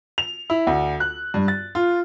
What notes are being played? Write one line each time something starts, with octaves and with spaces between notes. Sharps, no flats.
F7
E4
D2
F#6
G2
A6
F4